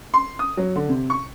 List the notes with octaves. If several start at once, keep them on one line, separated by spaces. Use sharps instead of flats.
C6
D#6
F#3
D3
C3
C#6